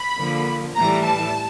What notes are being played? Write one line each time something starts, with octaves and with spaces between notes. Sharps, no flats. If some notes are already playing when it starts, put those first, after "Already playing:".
Already playing: B5
D3 F3 A#3
A2 E3 G3 A#5
A5